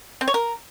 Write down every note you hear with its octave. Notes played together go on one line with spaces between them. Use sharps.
C4
C#5
A#4